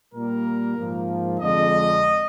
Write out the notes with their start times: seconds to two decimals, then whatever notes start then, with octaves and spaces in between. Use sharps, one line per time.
0.14 A#2 G3 A#3 A#4
0.77 G#2 F3 A#3
1.40 F2 D3 G#3 D#5